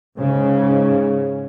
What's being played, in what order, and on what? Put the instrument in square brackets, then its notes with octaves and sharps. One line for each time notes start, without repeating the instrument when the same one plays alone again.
[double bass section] G#2 C#3